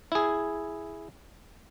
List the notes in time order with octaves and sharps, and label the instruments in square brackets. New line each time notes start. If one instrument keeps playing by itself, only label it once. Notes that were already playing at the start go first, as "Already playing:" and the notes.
[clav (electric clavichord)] E4 G#4